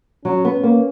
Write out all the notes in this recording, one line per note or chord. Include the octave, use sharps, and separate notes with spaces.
F#3 C#4
B3
A#3